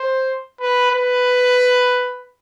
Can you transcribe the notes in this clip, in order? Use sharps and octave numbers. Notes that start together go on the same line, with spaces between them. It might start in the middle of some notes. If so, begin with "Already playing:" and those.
Already playing: C5
B4
B4